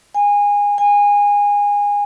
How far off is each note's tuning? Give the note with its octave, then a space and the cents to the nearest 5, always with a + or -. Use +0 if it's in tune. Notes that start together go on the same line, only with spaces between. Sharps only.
G#5 -25
G#5 -25